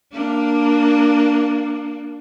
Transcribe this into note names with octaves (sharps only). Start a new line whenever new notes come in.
A#3 D4